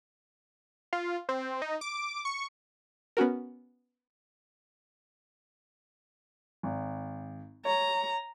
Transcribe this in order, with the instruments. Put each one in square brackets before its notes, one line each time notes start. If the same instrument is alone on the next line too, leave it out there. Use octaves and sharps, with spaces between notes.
[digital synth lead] F4
C4
D#4
D6
C#6
[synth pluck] B3 C#4 F#4 A#4
[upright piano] G#1
[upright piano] C#5 [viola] A#5